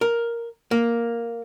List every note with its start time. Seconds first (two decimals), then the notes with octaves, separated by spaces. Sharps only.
0.01 A#4
0.71 A#3